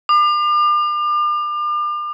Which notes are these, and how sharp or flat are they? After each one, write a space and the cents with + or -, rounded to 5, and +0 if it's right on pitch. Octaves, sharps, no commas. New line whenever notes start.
D6 +40